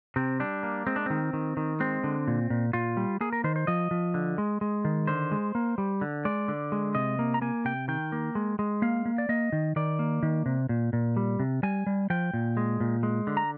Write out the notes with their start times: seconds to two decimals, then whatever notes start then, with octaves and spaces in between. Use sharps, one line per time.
0.16 C3 C4
0.40 G3 D4
0.63 A#3
0.87 G#3 C4
0.96 D4
1.06 D#3 C4
1.33 D#3
1.57 D#3
1.80 G#3 C4
2.04 D3
2.27 A#2
2.50 A#2
2.73 A#2 F4
2.97 G3
3.21 A#3 G#4
3.33 A#4
3.44 D#3 C5
3.56 C5
3.67 F3 D#5
3.91 F3
4.14 D3
4.38 G#3
4.61 G#3
4.85 D#3
5.07 D3 C5
5.31 G#3
5.55 A#3
5.78 G3
6.01 D3
6.25 G#3 D5
6.48 D3
6.72 G#3
6.95 C3 D#5
7.19 A#3
7.34 A#5
7.41 A#3 G#5
7.65 C3 G5
7.88 D#3 G5
8.12 A#3
8.35 G#3
8.59 G#3
8.82 A#3 F5
9.06 A#3
9.18 D5
9.29 A#3 D#5
9.52 D#3
9.76 D#3 D5
9.99 A#3
10.23 D#3
10.46 C3
10.69 A#2
10.93 A#2
11.17 G3
11.40 C3
11.63 G3 G#5
11.87 G3
12.10 F3 G5
12.34 A#2
12.57 G#3
12.81 A#2
13.03 G#3
13.27 D3
13.37 A#5